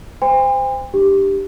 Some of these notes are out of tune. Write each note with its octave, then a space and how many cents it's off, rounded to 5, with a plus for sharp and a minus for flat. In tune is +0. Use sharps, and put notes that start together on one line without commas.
C5 -25 G5 +45 C6 -35
D4 +35 G4 +0